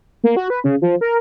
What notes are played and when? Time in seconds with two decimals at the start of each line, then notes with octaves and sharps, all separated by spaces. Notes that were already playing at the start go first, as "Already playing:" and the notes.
0.24 A#3
0.37 F#4
0.50 B4
0.64 C#3
0.82 F3
1.01 A#4